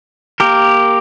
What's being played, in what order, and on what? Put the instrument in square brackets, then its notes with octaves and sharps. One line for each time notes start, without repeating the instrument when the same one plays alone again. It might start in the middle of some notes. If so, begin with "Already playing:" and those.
[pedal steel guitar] A#3 G4 A#4